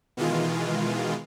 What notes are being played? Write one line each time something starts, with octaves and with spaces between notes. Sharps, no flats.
B2 D#3 E3 G#3 F4